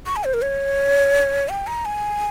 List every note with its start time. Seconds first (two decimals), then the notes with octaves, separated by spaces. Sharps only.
0.06 C#6
0.16 G#5
0.24 C5
0.34 A#4
0.42 C#5
1.49 G5
1.67 A#5
1.85 G#5